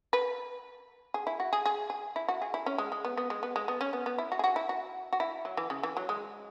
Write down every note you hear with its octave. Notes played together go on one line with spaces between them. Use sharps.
B4
G#4
E4
F#4
G#4
G#4
G#4
E4
F#4
G#4
E4
C#4
G#3
G#3
B3
B3
G#3
B3
G#3
B3
C#4
B3
B3
E4
F#4
G#4
F#4
E4
F#4
F#4
E4
F#3
E3
C#3
E3
F#3
G#3